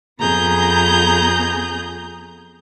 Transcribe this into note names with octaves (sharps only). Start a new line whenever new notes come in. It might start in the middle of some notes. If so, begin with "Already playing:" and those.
F2 B3 G#4 A#5 G6